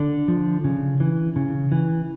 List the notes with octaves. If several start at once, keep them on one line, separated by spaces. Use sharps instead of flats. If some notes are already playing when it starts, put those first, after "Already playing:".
Already playing: D3 D4
F3
C#3
E3
C#3
E3